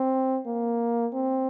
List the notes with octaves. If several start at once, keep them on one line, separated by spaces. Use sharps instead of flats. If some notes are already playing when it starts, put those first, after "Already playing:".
Already playing: C4
A#3
C4